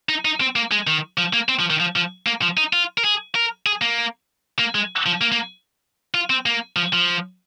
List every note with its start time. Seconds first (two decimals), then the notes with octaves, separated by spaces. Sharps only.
0.09 D#4
0.25 D#4
0.41 C4
0.56 A#3
0.72 G#3
0.87 D#3
1.18 F3
1.33 A#3
1.49 C4
1.60 F3
1.70 D#3
1.80 F3
1.96 F3
2.27 A#3
2.42 F3
2.57 D#4
2.73 F4
2.98 A#4
3.04 G#4
3.35 A#4
3.66 G#4
3.82 A#3
4.59 A#3
4.75 G#3
5.06 F3
5.21 A#3
5.32 A#3
6.14 F4
6.30 C4
6.46 A#3
6.76 F3
6.93 F3